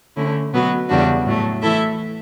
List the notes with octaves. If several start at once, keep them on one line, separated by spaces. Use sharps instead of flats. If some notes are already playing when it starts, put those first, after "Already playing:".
D3 A3 C#4 E4
B2 F#3 B3 F#4
E2 C#3 G3 D4 F#4
A2 F#3 A3
E3 A3 E4 A4 E5